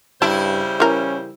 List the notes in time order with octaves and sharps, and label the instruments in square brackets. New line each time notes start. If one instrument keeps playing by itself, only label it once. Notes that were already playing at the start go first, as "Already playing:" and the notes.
[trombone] G2 [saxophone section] C#3 G3 C5 [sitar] E4 [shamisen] A5
[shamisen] E3 A#4 [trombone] C#4